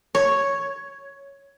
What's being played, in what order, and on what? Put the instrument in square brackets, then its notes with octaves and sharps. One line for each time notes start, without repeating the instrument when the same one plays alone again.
[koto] C#5